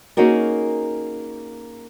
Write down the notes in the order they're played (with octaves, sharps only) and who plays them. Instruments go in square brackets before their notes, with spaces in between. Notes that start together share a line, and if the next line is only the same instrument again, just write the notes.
[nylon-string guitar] A#3 C#4 D#4 F#4 G#4 A#4